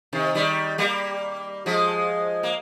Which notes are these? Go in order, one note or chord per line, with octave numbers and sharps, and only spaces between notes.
C3 D#3
D#3 G3
G3 A#3
F3 G#3
A#3